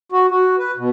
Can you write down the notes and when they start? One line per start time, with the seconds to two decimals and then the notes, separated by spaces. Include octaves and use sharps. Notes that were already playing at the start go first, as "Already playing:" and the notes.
0.12 F#4
0.31 F#4
0.58 B4
0.77 B2